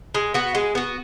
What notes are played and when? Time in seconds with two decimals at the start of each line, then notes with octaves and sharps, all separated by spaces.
0.15 G#3
0.34 B3 F#4
0.55 G#3
0.75 B3 F#4